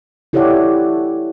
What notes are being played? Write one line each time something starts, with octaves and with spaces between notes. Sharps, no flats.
E4 G4 A4 C#5 D5 F#5